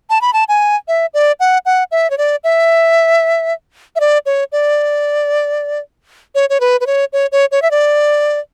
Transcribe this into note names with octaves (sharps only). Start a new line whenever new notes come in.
A5
B5
A5
G#5
E5
D5
F#5
F#5
E5
C#5
D5
E5
E5
D5
C#5
D5
C#5
C#5
B4
B4
C#5
C#5
C#5
C#5
E5
D5